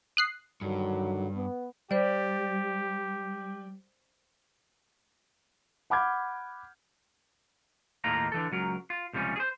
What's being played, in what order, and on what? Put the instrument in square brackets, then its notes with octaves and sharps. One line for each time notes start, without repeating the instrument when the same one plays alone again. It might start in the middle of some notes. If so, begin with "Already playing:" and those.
[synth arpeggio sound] D#6 F#6 C7
[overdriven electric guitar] G2 [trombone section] D3 D#3 F#3
[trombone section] B3
[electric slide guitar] G3 [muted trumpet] G4 [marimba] C5 D5
[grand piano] F#5 B5 D6 F6 G6 G#6
[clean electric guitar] D#2 A2 D#3 A#3 F4 A#5
D3 E3 A4
C#2 F#3 A#4
F4
C#2 C3 F3 G3 C#4
G#4 C5